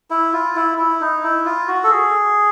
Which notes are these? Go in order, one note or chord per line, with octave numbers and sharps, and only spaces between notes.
E4
F4
E4
E4
D#4
E4
F4
F#4
A4
G#4